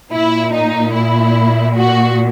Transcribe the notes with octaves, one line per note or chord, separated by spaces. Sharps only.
A#2 E4
D#4
E4
F#4